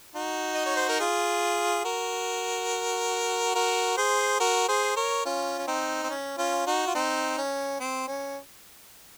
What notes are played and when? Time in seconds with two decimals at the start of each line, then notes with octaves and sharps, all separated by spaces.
0.15 D#4 F#4
0.54 D#5
0.66 C#5
0.76 C5
0.89 A#4
1.00 F4 G#4
1.84 F#4 A#4
3.55 F#4 A#4
3.97 G#4 C5
4.40 F#4 A#4
4.68 G#4 C5
4.96 A#4 C#5
5.25 C#4 F4
5.58 C#4
5.67 C4 D#4
6.03 C4
6.10 C#4
6.38 C#4 F4
6.66 D#4 F#4
6.87 F4
6.95 C4 D#4
7.38 C#4
7.80 C4
8.07 C#4